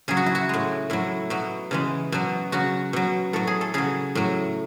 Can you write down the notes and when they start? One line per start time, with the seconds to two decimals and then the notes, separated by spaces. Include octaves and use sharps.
0.08 C#3 F#3 G#4
0.17 F#4
0.26 E4
0.35 F#4
0.49 A2 G#3
0.90 A2 F#3 E4
1.30 B2 F#3
1.71 C#3 E3 G#3
2.12 B2 F#3
2.52 C#3 F#3 F#4
2.93 B2 F#3
3.33 A2 F#3 A4
3.47 G#4
3.61 A4
3.74 C#3 F#3 G#4
4.15 A2 F#3